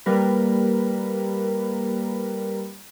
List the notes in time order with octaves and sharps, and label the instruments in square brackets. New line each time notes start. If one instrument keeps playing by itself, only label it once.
[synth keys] G3 A#3 A#4 B4